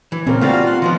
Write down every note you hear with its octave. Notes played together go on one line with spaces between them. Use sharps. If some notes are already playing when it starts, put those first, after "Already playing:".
E3
A#2 C#3 C4 C#4 A#4
G3 A3 B3 F4 F#4 F5
F4
F#5 C6
D#3 F3 B3 F4